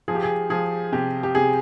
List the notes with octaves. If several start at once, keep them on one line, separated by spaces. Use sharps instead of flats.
F3 G#4
G4
G#4
F3 G#4
C3 G4
G4
C3 G#4